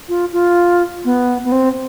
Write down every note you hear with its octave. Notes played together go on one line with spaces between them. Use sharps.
F4
F4
B3
B3
C4